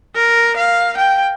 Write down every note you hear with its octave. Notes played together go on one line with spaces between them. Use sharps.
A#4
F5
G5